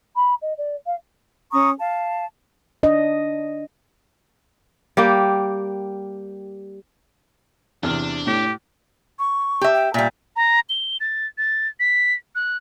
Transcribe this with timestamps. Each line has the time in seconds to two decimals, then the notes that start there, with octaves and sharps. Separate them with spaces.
0.16 B5
0.42 D#5
0.58 D5
0.86 F5
1.52 C#4 A#5 C#6 D#6
1.78 F5 A5
2.83 D4 D#5
4.97 G3 A#3 G4
7.83 E2 C3 D4 F6
8.27 A2 G4
9.19 C#6
9.61 G4 E5
9.74 G5
9.94 A#2 G3 E5
10.36 A#5
10.69 G7
11.00 A6
11.38 A6
11.80 B6
12.35 F#6